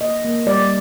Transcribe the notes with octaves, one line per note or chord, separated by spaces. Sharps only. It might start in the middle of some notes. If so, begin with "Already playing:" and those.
A#3 D#5
A#3
G3 D5